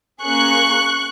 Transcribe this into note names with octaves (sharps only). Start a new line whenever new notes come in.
A#3 C#4 G#4 C#6 F#6